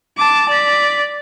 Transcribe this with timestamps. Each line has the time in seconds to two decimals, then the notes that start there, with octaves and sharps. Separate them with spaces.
0.17 A5 D6
0.49 D5 B6